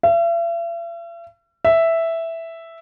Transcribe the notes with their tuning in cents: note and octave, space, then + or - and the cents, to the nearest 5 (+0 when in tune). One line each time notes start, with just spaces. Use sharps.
E5 +45
E5 +0